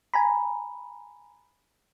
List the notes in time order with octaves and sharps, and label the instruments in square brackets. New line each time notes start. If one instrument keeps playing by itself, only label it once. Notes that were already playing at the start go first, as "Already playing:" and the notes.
[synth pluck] G#5 A#5 B5